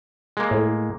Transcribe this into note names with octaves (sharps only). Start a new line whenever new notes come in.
G#3 A#3
A2